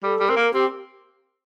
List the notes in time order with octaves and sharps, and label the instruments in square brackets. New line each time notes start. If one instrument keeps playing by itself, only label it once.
[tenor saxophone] G3 [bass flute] A4
[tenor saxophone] G3
[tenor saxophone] C4 [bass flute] A#4
[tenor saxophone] A#3
[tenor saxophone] C4 [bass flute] G4